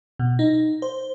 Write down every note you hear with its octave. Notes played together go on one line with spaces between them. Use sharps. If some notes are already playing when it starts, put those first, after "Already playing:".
B2
D#4
C5